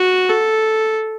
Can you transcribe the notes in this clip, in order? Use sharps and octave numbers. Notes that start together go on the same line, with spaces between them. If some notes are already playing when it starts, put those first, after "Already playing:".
Already playing: F#4
A4